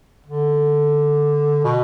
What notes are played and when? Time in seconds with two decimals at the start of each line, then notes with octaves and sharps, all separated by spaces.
0.27 D3
1.64 B2